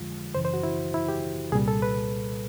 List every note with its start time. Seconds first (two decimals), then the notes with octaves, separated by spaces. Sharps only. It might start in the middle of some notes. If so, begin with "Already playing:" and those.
Already playing: F2 D3 F3 G#3 F4
0.34 F#2 C#3 E3 C5
0.45 C5
0.54 F#4
0.63 E4
0.94 E4
1.08 G4
1.52 C2 A#2 G3 G#4
1.68 A4
1.82 B4